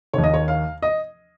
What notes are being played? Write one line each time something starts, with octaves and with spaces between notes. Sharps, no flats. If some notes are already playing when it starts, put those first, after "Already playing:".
D#2 D#3 C#5
D#5
C#5
F5
D#5